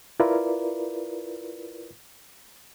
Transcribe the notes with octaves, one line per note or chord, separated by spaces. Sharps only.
E4 F4 A#4 B4 D5